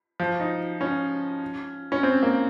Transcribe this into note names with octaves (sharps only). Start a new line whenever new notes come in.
F3
D#4
C#4
C#4
C4
A#3